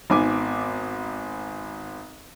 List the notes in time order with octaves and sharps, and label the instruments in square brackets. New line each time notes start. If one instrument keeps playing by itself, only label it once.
[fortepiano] G#1 D#3 B3 G#5 D6